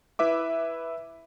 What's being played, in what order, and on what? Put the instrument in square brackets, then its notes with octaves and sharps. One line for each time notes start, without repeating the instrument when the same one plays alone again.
[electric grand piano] E4 B4 E5 D6